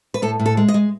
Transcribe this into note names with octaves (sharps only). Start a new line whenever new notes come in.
B4
A2 A4
A2
A4
G#3
D#5
G#3